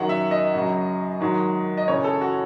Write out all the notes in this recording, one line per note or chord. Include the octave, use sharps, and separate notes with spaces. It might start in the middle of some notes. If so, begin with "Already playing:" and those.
Already playing: F#2 D#3 F#3 F#5
E5
D#5
F#2 C#3 F#3
G#2 D#3 F#3
D#5
F#2 C#3 E3 C#5
A4
F#4